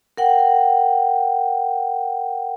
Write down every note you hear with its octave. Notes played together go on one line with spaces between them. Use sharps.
A#4 F#5 G5